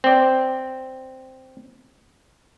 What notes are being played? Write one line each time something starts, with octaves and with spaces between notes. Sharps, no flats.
C4 D5